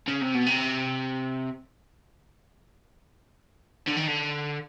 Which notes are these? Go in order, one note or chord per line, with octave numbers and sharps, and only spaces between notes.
C#3
C3
B2
C3
D3
D#3
D3